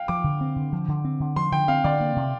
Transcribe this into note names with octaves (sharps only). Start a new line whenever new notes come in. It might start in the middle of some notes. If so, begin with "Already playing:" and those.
Already playing: F5 G5
F3 D6
D3
C4
D3
F3
D3
C4
D3
F3 C6
D3 G5
C4 F5
D3 D5
A#3
C3